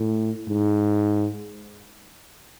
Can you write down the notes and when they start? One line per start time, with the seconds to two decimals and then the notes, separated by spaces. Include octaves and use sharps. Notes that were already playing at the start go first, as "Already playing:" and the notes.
Already playing: A2
0.49 G#2